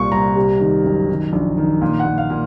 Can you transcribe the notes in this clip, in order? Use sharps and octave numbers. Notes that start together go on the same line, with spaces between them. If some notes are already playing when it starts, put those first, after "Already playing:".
Already playing: C2 A#2 C#6
C2 A#5
C3
D#3
F#1
D#3
A#1
D#3
A#2
F#5
A#2
F5
A#2